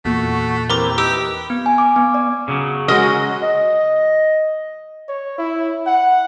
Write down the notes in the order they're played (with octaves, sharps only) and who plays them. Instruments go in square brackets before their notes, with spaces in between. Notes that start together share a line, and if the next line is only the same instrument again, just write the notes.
[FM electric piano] E2 A#2 [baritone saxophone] A3 [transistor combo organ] F#4
[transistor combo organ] E3 C4 G4 [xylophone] A#4 A#5 D6
[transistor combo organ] D#4 B4 [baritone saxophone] G4 [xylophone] D6 E6
[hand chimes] B3
G#5
D6
B3
D5
[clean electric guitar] C#3 F#3
[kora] G#3 A#4 [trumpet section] C#4 F#4 [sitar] D#5
[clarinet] D#5
[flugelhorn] C#5
E4
F#5